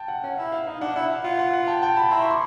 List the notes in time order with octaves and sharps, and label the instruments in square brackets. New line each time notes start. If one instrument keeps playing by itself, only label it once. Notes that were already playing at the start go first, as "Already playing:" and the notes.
Already playing: [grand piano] G5 A5
F#5
[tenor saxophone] C#4 [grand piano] F#5
[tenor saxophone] E4 [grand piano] F5
[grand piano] F5
[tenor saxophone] D#4 [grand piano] F5
[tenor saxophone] D4 [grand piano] F#5
[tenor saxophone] E4 [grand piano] F#5
[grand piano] F5
[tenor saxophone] F4 [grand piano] F#5
[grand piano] F#5
F#5
G5 A5
G5 A5
A5 B5
[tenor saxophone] E4 [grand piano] A#5 C6
[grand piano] B5 C#6
C6 D6